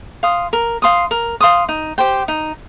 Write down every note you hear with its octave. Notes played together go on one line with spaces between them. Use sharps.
F5 C6 D#6
A#4
F5 C6 D#6
A#4
F5 C6 D#6
D#4
G4 C5 G5
D#4